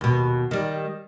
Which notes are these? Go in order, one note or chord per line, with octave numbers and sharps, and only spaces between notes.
D#2 B2
D#3 G3